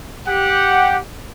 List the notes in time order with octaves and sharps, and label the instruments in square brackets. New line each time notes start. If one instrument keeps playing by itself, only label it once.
[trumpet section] G4 F#5